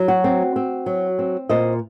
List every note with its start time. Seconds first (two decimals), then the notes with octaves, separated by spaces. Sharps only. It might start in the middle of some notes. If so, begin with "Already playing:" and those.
Already playing: F#3
0.08 F#4
0.24 C4
0.56 C4
0.86 F#3
1.19 C4
1.49 A#2 C5 D#5